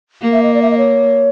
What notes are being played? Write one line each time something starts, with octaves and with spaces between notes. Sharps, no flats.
A#3
E5
D#5
D5
E5
D#5
C#5